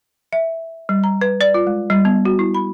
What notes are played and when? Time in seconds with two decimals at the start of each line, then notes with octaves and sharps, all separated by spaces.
0.33 E5
0.89 G3
1.04 A#5
1.21 B4
1.41 D5
1.54 F4
1.67 G#3
1.90 G3
2.05 B3
2.25 F#4
2.39 E4
2.55 B5